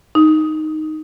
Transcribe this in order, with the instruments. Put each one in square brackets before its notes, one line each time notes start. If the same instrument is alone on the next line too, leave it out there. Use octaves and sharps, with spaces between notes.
[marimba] D#4